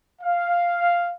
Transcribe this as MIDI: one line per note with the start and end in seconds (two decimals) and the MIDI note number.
0.22 1.13 77